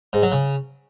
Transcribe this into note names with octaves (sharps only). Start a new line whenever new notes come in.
G#2
F#3
C#3